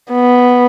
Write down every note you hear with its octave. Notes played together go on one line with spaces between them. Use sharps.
B3